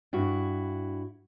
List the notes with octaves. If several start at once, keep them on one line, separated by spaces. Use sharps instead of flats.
G2 E4 F#4